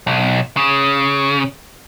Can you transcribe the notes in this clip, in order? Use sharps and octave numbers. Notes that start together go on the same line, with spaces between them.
B1
C#3